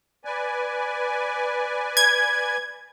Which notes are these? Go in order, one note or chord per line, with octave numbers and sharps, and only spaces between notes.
B4 D5 G#5
G#6